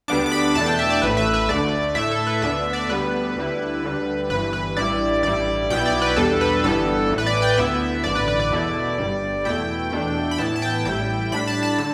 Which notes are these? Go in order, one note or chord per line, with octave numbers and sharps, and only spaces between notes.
D2 D3 G3 B3 D4 D6
D6
B5
E2 B2 A3 D4 A5
G5
E5
D5
A1 A2 A3 B4
E5
B4
D2 D3 A3 D5
A2 A3 E4 E5
A4
B4
D2 D3 B3 D4 E5
D5
D2 D3 G3 B3 B4
D2 D3 G3 E4
D2 D3 G3
G1 G2 E3 B4
B4
A1 G2 G3 E4 D5
A1 G2 G3 E4 D5
B1 B2 B3 E4 G5
D5
B4
E2 B2 G3 D4 A4
B4
G1 G2 E3 G3 B3 A4
A1 A2 E3
B4
D5
G5
D2 D3 B3 E4 E5
A1 G2 D3 D5
B4
B4
D5
E2 B2 A3 E4
G1 G2 G3
E2 B2 A3 E4 G5
E2 B2 A3 D4
B5
A2 E3 B3 E4 A5
A5
G5
A1 A2 G3 E4 G5
A2 G3 D4 B5
A5
A5
D3 A5